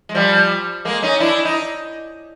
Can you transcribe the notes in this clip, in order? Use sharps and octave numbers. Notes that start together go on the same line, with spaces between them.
G#3
F3 G3
G#3 A#3
C#4 D#4
D4 E4
D#4